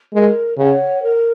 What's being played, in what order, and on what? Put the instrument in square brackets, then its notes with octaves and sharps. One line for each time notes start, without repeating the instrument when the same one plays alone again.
[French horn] G#3 [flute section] A#4
[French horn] C#3 [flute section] C#5 F#5
[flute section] A#4